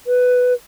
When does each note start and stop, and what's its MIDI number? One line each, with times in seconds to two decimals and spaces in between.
0.07 0.53 71